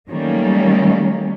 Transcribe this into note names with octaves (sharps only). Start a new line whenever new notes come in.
D#3 F#3 G3 A3 A#3 C#4